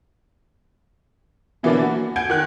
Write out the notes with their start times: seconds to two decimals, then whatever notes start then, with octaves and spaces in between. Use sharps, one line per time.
1.63 B2 E3 F#3 A#3 B3 D4
1.82 F#4
2.16 F#5 G#5 G6 G#6 D7
2.30 D#3 F#6